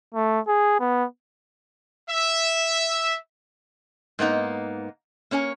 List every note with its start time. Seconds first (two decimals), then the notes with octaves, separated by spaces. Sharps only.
0.14 A3
0.47 G#4
0.80 B3
2.10 E5
4.19 G#2 A#3 B3 D#4
5.31 A#3 C#4 C#5 G#5